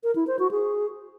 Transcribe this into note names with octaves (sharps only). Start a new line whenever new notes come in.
A#4
E4
C5
F#4
G#4